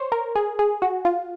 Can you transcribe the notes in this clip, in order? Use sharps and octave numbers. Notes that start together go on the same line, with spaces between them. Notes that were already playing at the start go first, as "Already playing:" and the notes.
Already playing: C5 C#5
A#4
G#4
G#4
F#4
F4